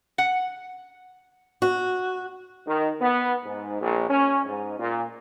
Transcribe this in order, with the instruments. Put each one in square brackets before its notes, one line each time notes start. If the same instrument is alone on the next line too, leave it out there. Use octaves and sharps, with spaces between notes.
[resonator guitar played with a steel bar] F#5
[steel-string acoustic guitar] F#4
[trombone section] D#3
B3
G#2
A#1
C#4
G#2
A#2